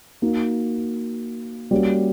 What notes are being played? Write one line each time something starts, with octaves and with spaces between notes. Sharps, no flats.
A#3 D#4 F#4
G3 A#3 C#4 F#4